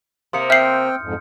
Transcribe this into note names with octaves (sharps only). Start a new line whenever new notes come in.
C3 A#3 C6 D#6 C#7
C4 E5 G5 F6 G6 C7
F2 G#2